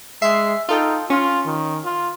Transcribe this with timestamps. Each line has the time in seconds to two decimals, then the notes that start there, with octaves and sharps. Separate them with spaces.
0.22 G#3 E5 C7
0.69 D#4 F4 A4 G5
1.10 C#4 F4
1.46 D#3
1.85 F4